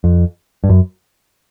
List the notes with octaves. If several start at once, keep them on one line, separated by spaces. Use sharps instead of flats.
F2
G2
F#2